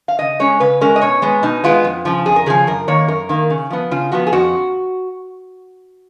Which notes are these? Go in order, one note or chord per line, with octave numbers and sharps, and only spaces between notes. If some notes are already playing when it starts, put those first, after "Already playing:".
F5
C#3 D#5
G#3 C#4 C#5
C#3 B4
G#3 C#4 A#4
D#5
B2 C#5
G#3 B3
B2 D#4
G#3 B3 F4
F2
C#3 F3
F2 G#4
A#4
C#3 F3 G#4
F#2 A#4
D#3 A#3 C#5
F#2 A#4
D#3 A#3
C#3
F3 B3
C#3 F4
F3 B3 F#4
G#4
F2 F#4